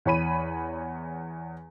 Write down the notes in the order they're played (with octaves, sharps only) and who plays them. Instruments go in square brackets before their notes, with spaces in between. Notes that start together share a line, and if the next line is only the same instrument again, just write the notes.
[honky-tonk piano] E2 C#5 B5 D#7